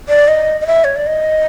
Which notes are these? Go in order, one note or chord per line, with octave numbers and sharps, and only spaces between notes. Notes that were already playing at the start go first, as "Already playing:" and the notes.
D5
D#5
D#5
E5
C#5
D5
D#5